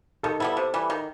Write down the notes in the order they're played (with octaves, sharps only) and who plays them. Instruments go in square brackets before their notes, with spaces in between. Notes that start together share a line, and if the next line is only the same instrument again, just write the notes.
[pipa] D#3 [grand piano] A4
[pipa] G3 B3 E4 [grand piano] A4
[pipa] C3
E3 G3
D#3